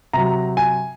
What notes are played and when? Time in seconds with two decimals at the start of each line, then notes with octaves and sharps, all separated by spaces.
0.13 C3 F#3 A#5
0.57 G#5